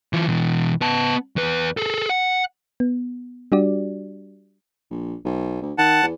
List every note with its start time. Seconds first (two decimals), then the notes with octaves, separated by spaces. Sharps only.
0.13 E3 F4
0.28 B2 E3
0.81 B3 A5
1.36 E2 B4
1.77 G#4 A4
2.10 F#5
2.80 B3
3.52 G3 D4 F#4 G4 D5
4.91 A#1
5.25 B1
5.62 D2
5.78 D#3 F#5 A5
6.03 E2